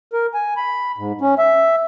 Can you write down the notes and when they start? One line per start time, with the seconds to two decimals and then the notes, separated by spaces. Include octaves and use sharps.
0.13 A#4
0.34 G#5
0.57 B5
0.98 G#2
1.21 C#4
1.38 E5